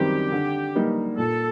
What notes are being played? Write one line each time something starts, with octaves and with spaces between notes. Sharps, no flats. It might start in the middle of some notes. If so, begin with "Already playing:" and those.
Already playing: F#2 D#3 G3 C4 D#4 G4
D3
G3 A#3 D#4
A#2 A4